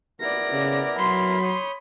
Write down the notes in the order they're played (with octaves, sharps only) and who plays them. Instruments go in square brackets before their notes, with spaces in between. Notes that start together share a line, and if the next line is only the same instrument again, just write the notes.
[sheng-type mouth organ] B3 E4 A#4 [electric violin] D5 A#6
[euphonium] C#3
[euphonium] F#3 [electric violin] B5 [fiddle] C6
[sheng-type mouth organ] C#5 D#6 G6